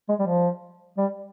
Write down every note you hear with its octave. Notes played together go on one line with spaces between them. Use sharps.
G#3
G3
F3
G3